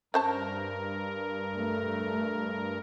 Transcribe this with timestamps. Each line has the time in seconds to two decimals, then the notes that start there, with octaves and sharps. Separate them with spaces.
0.14 G2 C#4 A#4 C5 A5
1.57 A3